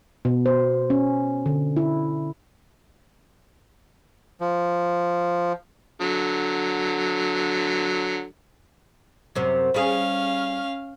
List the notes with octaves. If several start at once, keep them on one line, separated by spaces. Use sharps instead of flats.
B2
C5
C#4
D3
E4
F3
D3 F#3
F#2 C3 C4
G3 C#4 G#4 F5